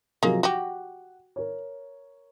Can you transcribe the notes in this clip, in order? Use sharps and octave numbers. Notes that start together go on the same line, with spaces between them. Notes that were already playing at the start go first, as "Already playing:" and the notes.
C3 F3 F#3 G#3 A#3
F#4 G4 F#5
A#4 C#5